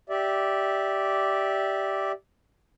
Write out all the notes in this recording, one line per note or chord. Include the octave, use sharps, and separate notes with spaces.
G4 D5 E5